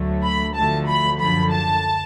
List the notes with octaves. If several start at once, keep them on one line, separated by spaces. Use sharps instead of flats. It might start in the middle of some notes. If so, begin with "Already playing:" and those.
Already playing: D2 D3 F#3 A3
B5
D2 D3 F3 A3 A5
B5
F#2 D3 F3 B5
A5